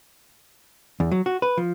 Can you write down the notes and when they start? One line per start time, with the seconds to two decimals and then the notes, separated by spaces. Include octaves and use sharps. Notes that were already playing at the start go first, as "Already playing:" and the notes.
1.00 E2
1.11 F#3
1.26 F#4
1.42 B4
1.57 F3